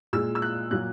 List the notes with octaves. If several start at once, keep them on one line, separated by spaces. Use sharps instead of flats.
A#2 G#3 E6
E6
F#6
A#2 F#3 A#3 F#6